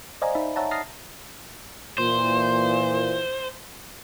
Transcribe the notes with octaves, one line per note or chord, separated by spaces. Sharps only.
C5 D5 D#5 F5 G#5 A#5
D#4 E5 B5
C#5 E5 F#5 A5 A#5
D#6 F6 A6 A#6 C7
A#2 E3 C5